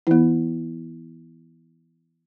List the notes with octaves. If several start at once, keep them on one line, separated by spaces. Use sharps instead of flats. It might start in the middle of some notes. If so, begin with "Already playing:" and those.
E3 B3 E4